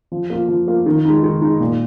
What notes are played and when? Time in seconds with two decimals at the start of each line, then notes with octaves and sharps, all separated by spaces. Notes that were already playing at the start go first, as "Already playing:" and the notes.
0.12 F3
0.30 A#3 F4
0.48 F3
0.68 A#3 F4
0.86 D#3
1.05 G#3 D#4
1.23 D#3
1.42 G#3 D#4
1.60 A#2